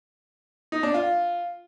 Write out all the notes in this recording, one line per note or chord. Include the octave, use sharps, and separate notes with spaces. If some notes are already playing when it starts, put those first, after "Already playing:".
D#4
D4
F4